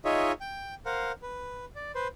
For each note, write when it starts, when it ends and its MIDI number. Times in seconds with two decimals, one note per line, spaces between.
0.05 0.32 63
0.05 0.32 65
0.05 0.32 68
0.05 0.32 73
0.05 0.32 75
0.05 0.32 76
0.41 0.75 79
0.86 1.12 70
0.86 1.12 72
0.86 1.12 77
0.86 1.12 78
1.22 1.65 71
1.75 1.92 74
1.95 2.08 71
1.95 2.08 72